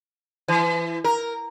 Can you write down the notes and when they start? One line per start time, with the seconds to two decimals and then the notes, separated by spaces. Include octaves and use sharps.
0.48 E3
1.04 A#4